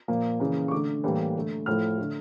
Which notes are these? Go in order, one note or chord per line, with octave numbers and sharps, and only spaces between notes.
A#2 F3 A#3
C#3 E3 A#3
C#6
D3 A3 D6
A2 E3 G3 A#3
D3 A3
A2 F3 A3 F6
D3 A3